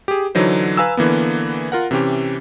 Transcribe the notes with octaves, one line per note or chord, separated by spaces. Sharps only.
G4 G#4
D3 E3 F#3 D#4 C5
B4 F5 G#5 A#5 E6
D3 E3 A#3 B3
F4 A#4 F#5
C3 E3 C#4 G4